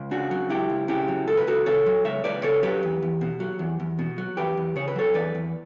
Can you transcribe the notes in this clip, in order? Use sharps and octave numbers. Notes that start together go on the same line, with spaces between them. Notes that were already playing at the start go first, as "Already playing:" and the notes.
Already playing: C#2
C#3 D4 F#4
F#3
C#2 E4 G4
C#2
C#3 E4 G4
F#3
C#2 A4
B4
C#2 F#4 A4
C#3 A4 C#5
F#3
C#2 C#5 E5
C#2 B4 D5
C#3 A4 C#5
F#3 G4 B4
E2
E2
B2
F#3
E2
E2
B2
F#3
E2 G4 B4
E2
C#3 C#5
B4
F#3 A4 C#5
E2 B4 D5
E2